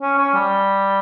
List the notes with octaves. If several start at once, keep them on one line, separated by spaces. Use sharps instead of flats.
C#4
C#4
G3